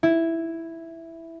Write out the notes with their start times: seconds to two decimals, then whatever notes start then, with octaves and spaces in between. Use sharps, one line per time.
0.03 E4